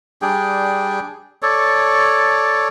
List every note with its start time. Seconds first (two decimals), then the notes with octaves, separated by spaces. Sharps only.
0.22 G3 D4 G#4 G5
1.42 A4 C#5 D5